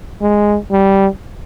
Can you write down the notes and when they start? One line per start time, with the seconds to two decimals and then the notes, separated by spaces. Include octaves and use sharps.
0.21 G#3
0.72 G3